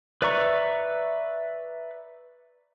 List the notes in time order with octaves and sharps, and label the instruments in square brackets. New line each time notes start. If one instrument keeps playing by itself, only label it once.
[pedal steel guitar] B4 D5 E5 A#5 C#6